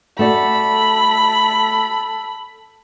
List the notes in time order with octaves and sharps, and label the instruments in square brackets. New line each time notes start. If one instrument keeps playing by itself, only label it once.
[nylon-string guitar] A3 F#4 D5 [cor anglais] A4 [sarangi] B5